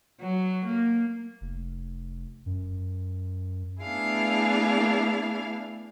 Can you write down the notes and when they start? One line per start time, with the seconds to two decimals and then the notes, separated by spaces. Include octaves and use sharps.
0.21 F#3
0.65 A#3
1.41 F1
2.46 F#2
3.83 A3 B3 D4 E4 G#4 F5